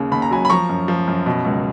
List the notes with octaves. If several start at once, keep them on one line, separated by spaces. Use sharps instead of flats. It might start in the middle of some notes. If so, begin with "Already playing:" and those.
Already playing: D#2 C#3
D#2 B5
A#5
F#3 G#5 B5
B5
F3 A#5 C#6
F#2
F3
F#2
B2
C#2